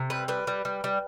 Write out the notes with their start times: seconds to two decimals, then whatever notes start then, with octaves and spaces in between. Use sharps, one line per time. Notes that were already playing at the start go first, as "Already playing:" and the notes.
Already playing: C3
0.10 G3 B4
0.28 G3 B4
0.47 G3
0.65 G3
0.84 G3